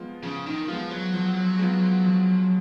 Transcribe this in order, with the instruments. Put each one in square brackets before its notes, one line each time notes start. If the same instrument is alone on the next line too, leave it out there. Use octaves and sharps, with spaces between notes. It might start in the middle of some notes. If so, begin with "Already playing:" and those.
Already playing: [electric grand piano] F3 G#3 B3 F4
[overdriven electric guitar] C#3 [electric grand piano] F3
[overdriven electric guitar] D#3
[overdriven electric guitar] F3 [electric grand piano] G#3 B3 F4
[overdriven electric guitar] F#3
[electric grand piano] F3
G#3 B3 F4
F3